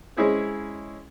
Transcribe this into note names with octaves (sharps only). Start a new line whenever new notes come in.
G#3 C#4 E4 G#4 C5